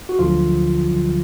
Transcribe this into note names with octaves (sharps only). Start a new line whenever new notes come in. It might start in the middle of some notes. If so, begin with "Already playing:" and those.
F#4
D2 D3 F3 F#3 F4
D2 D3 F#3